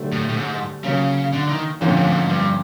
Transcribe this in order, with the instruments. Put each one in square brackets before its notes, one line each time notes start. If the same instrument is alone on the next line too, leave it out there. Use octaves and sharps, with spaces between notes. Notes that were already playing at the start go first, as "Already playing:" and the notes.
Already playing: [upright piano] D3 F#3 A3 D4 G4
[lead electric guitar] A2
A2
G#2
[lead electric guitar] C#3 [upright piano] F#3 A#3 C#4
[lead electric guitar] D3
D#3
[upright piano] F2 D3 F3 A#3 C#4 [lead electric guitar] G#2
[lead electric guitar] A2
G#2
A2
G#2
G2